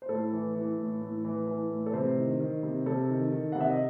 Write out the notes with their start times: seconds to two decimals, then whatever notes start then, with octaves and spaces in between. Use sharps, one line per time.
0.02 C5
0.09 A2 A4
0.32 E3
0.55 E3
0.78 A2
1.01 A2
1.25 E3
1.47 E3
1.71 A2
1.86 A4
1.93 C3 C5
2.17 D#3
2.40 D#3
2.63 C3
2.86 C3 A4
3.09 D#3
3.32 D#3
3.52 C3 F#5
3.60 E5
3.70 D#5